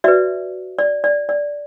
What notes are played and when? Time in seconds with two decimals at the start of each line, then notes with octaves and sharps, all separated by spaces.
0.04 F#4 B4 D5 E5
0.79 D5
1.04 D5
1.29 D5